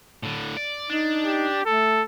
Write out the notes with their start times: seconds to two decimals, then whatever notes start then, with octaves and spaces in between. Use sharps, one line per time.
0.23 A2 D3
0.57 D5
0.90 D4 D#4
1.24 G4
1.66 A3 A4